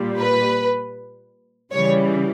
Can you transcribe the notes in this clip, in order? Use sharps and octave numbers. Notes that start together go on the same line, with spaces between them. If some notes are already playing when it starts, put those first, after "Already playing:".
Already playing: A#2 G3
B4
C#3 E3 G3 C#5